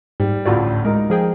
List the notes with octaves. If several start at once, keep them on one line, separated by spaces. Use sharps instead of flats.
G#2 G3
A1 D2 A2 F4 F#4 D5
G#3 D#4 A#4
F3 G#4 G5